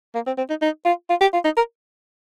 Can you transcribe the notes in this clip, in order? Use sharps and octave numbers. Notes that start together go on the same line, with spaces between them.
A#3
C4
C4
D#4
D#4
F4
F4
G4
F4
D#4
A#4